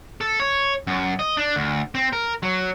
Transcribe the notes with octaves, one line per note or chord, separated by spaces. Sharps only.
A4
C#5
F#2
D#5
D4
D2
C4
A#4
F#3